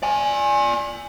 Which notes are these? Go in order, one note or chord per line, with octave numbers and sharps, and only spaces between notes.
D5 G#5